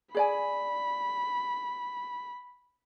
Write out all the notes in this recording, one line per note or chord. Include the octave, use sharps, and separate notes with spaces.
G#4 D5 G#5 B5